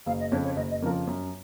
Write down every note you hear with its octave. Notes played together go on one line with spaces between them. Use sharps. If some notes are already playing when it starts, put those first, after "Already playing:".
F#1 F5
D#5
F2 C#3 F3 C#5
C#5
F#1 D#5
D#5
F2 C#3 F3 A#4
F#2